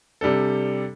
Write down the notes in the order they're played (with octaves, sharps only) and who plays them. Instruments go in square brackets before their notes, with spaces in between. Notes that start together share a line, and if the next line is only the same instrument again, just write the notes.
[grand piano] C3 G3 D4 A4